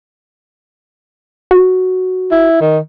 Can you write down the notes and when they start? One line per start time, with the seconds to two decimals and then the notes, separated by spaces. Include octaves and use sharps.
1.51 F#4
2.31 E4
2.61 D#3